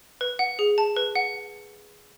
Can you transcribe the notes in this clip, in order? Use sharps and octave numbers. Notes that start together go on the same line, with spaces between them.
B4
F#5
G#4
A5
B4
F#5